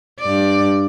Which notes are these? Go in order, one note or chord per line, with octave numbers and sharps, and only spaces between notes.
G2 D5